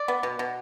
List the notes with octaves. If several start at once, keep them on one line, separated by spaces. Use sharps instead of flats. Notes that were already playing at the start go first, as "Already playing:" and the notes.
Already playing: D5
B3
B2
B2